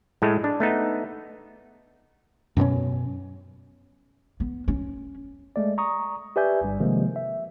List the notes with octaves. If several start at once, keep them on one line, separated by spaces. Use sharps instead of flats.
A2 G#3 A3
D4
A3 B3 D#4
F#2 B2 B3 C#4
B3
C#4
G#3 A3 D5
A#5 C#6 D#6
G4 B4 D5 E5 G#5 G6
G1 G2 G3
C3 D#3 F3 G#3 A#3
E5